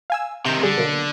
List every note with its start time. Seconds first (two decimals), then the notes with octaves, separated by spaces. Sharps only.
0.10 F5 G#5 E6
0.46 C3 D#3 G6
0.63 D3 G3 G#4
0.77 B2 F#3 A#3